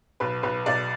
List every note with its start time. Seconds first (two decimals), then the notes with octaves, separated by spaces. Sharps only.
0.20 B1 B4
0.43 B1 B4
0.66 B1 D5